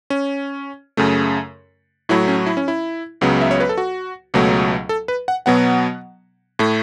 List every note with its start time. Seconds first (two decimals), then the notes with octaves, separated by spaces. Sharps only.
0.10 C#4
0.97 F#2 C#3 A3
2.09 A2 F#3 A3 E4
2.28 C#4
2.46 E4
2.57 C#4
2.68 E4
3.21 C#2 C#3 F#3 B3
3.41 E5
3.51 C#5
3.60 B4
3.69 A4
3.78 F#4
4.34 C#2 B2 F#3 A3
4.89 A4
5.08 B4
5.28 F#5
5.46 B2 F#3 B3 F#5
6.59 A2 A3